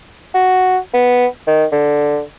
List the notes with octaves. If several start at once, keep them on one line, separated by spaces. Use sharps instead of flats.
F#4
B3
D#3
D3